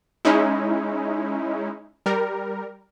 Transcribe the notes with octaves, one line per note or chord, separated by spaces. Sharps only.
G#3 C#4 D#4 E4
G3 A#4